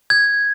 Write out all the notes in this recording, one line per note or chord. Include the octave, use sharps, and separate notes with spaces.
G#6